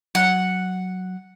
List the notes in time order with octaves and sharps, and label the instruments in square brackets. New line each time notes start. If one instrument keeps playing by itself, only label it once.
[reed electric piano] F#3 [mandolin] F#5